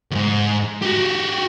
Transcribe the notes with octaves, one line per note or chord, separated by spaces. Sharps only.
D#2 G#2
F#4 G4